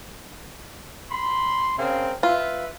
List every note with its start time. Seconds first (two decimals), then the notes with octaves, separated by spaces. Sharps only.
1.10 B5 C6
1.78 C#3 C4 A#4
2.23 F4 B4 E5